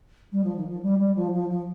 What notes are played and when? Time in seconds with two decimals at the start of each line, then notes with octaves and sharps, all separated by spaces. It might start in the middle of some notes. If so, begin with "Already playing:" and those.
0.32 G3
0.44 F3
0.56 D#3
0.69 F3
0.82 G3
0.99 G3
1.15 F3
1.33 F3
1.49 F3